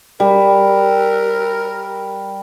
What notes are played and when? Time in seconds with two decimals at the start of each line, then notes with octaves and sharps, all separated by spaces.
0.20 G3 A#4